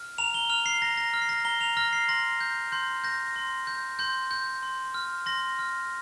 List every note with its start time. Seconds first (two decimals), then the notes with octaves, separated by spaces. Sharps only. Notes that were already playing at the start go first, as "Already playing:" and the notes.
Already playing: F6
0.18 A#5 F7
0.34 G7
0.50 F6 F7
0.66 C7
0.82 A#5 A#6
0.97 A#6
1.14 F6
1.22 C7
1.29 A#6
1.45 A#5 G7
1.61 F7
1.77 F6 A#6
1.93 C7
2.08 C6 A#6
2.41 G6
2.72 C6 G6
3.04 G6 A#6
3.36 C6
3.67 G6
3.99 C6 G6
4.31 G6
4.63 C6
4.94 F6
5.26 C6 A#6
5.59 F6